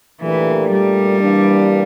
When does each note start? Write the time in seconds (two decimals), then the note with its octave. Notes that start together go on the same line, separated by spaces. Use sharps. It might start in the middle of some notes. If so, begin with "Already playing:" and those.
0.22 A#2 E3 A3 D4 G4 A#4
0.72 G3
1.20 G2 E3 A#3 D4